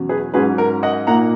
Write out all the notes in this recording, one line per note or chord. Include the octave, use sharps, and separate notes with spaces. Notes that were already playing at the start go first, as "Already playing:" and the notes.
Already playing: E2 B2 F#3 C#4
G#4 B4
G#2 F#3 C#4 G#4 B4
A#4
D#5 F#5
A#2 A#3 D#4 F#5 A#5